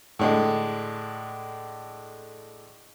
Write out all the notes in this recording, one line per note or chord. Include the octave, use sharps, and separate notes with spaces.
A2 D3 G#3